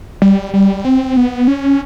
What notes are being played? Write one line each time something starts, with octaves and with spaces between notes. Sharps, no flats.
G3
G3
C4
B3
C#4